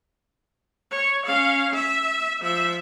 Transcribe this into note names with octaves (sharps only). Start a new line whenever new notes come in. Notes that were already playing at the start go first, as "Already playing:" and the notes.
C#5
C#4 F5
E5
F3 E5